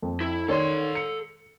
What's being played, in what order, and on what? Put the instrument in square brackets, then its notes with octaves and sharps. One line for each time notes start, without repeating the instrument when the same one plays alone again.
[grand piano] F2
[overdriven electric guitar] E4
[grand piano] D#3 C#5 D5 [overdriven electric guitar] A4 C6
[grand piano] C#7